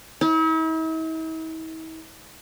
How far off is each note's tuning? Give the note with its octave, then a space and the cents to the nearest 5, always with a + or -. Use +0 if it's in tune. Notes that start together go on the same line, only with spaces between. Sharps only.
E4 -45